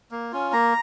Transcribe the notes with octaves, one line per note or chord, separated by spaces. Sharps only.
A#3
C#4 F4
A#3 A#5